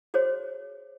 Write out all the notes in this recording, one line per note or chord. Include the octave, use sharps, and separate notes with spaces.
F#4 G#4 C5 C#5